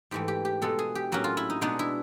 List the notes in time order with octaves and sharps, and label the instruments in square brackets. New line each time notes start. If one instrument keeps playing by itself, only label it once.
[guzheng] G#2 E3 A3 G4
G4
G4
B2 G#3 B3 A4
G#4
G4
A2 F#3 A#3 C#4 F#4
F4
E4
D#4
B2 G#3 B3 D4 D#4
E4